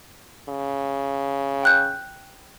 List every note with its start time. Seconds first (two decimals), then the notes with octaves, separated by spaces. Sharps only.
0.49 C#3
1.63 G5 F#6 G6